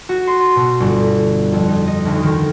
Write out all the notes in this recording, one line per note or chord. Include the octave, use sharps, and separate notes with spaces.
F#4
C6
B2
G1
F2
D#4
D#5
D2
D#3